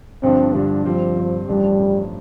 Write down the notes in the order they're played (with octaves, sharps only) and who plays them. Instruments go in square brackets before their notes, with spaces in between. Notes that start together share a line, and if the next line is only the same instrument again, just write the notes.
[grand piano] G2 D3 F3 D4 [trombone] C4
[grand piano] G2 D3 F3 D4 [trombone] G3
[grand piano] G2 G3 C4 [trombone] F3
[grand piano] G2 G3 C4
[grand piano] A1 G2 F3 D4 [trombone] G3
[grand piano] A1 G2 F3 D4